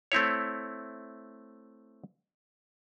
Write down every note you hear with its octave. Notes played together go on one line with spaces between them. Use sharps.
A3 C4 E4 C#5